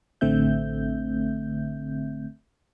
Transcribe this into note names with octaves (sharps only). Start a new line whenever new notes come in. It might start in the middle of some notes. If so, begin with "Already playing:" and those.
A1 D3 A3 C4 E5 G6